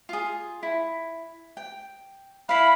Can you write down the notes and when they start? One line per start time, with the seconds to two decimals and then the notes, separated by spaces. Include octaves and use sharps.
0.09 F4 G#4
0.63 E4
1.57 G5
2.49 E4 F5 B5